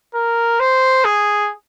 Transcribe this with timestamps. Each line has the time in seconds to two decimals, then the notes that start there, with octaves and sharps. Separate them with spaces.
0.15 A#4
0.60 C5
1.05 G#4